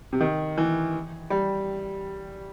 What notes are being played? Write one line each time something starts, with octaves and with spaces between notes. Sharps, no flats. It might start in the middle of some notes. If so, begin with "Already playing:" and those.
C3
D#3
E3
G3